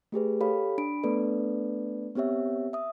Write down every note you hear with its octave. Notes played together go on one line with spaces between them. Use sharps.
A3 G4 G#4 B4
G4 A4 C#5 F5 B5
D4 B5 D7
A3 B3 D4 A4 B4 D5
B3 C4 G4 C#5 E5
E5 D#6